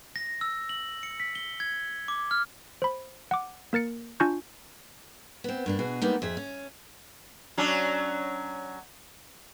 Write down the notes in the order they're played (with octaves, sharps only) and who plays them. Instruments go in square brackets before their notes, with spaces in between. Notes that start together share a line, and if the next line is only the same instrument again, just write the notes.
[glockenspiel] A#6
E6
F#7
C#7
B6
G7
G#6
D6
F6
[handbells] C5 B5
F#5 D6
A#3 A#4 A6 C#7
D4 F4 G#5 A5 C#6 G6
[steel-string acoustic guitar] B3 C4
G2 A#3 D4
B2 F#4 G#4
G3 G#3 A#3 B3 D#4
F2 G#4 E5
C#4
[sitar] F#3 C#4 D4